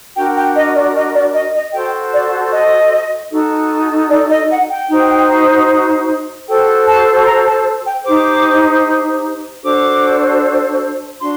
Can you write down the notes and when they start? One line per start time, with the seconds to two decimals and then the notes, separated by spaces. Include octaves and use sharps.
0.15 D4 F#4 A#4 G5
0.36 G5
0.55 D#5
0.74 D5
0.95 D#5
1.14 D5
1.34 D#5
1.54 D#5
1.74 F#4 A4 C5 G5
2.13 D5
2.52 D#5
3.31 D#4 F#4 A4
4.11 D5
4.30 D#5
4.50 F#5
4.69 G5
4.89 D#4 F#4 C5
6.47 F#4 A4 C5 G5
6.87 A5
7.21 C6
7.26 A#5
7.46 A5
7.85 G5
8.05 D#4 G4 C5 D6
9.63 D4 F#4 A4 C5 D6
11.20 D4 F#4 C6